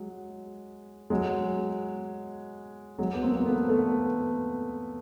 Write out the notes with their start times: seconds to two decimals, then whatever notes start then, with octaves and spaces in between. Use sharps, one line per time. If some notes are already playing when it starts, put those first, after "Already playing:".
Already playing: F#3 G#3
1.10 F#3 G#3
2.98 F#3 G#3
3.14 B3
3.22 A#3 C4
3.36 A#3
3.46 A3 B3
3.69 A3 B3